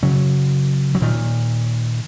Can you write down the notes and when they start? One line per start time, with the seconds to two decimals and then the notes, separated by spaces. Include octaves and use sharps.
0.03 C#3 F#3
0.95 F#3
1.02 A#2 D#3